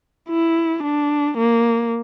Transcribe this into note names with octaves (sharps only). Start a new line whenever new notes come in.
E4
D4
A#3